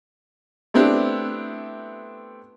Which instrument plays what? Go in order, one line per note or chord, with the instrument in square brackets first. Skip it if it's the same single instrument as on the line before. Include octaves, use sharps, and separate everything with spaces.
[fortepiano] A3 B3 C4 D4 E4 G4